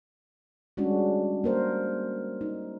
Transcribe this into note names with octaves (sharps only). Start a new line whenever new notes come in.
G3 G#3 C#4 D4 F#4
A#3 A#4 C5
D#4